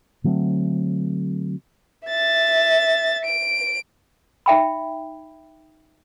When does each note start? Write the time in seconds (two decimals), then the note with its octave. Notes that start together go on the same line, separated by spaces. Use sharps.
0.24 D3 F#3 A3 C4
2.07 E5 A6
3.25 D7
4.46 D#4 E5 G5 B5